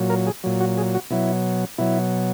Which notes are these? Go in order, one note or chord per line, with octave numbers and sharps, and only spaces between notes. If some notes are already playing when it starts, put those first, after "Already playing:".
Already playing: A#2 F#3
A#4
G#4
A#2 F#3
F#4
G#4
F#4
B2 F#3 E4
B2 F#3 E4